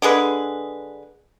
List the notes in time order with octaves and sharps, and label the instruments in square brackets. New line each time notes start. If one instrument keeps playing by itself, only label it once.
[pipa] D3 G#3 G#4 B4